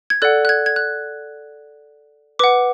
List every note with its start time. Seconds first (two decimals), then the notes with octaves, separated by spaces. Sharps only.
0.10 G#6
0.22 A4 D5 F#5 F#6
0.45 F#6
0.49 G#6
0.66 G#6
0.76 F#6
2.39 B4 F#5 D6